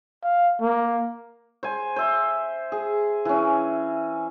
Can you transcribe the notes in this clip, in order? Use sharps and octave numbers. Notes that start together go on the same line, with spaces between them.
F5
A#3
C5 G#5
C5 E5
G#4
E3 C#4